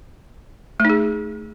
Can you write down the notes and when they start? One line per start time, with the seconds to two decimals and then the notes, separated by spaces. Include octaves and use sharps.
0.80 A3
0.85 D#4
0.90 G#4